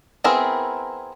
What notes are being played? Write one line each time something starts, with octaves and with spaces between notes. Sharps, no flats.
B3 C4 E4 G#4 A#4